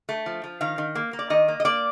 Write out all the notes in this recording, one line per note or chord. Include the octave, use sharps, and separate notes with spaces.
A3
F3
F3
D#3 F5
D#3
A#3
A#3
D5
D#3 D#5
A#3
D#5
A#3 D5